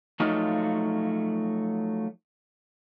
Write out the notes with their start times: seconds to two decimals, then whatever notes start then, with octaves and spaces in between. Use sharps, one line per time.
0.20 F3 F#3 A3 D#4 F4